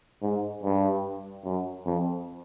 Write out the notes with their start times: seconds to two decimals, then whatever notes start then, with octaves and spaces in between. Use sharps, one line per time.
0.22 G#2
0.63 G2
1.45 F#2
1.86 F2